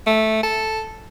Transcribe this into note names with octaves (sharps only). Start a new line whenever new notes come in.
A3
A4